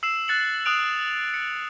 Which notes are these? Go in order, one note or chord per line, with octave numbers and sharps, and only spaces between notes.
E6 C7 E7
F#6 A6 C#7 F#7
D#6 E6 F#6 D7 F7
C#7